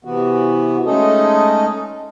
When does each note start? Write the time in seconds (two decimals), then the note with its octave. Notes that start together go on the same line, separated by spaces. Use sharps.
0.05 C3 E3 B3 F#4
0.86 G#3 A3 C#4 D#4 A4 D#5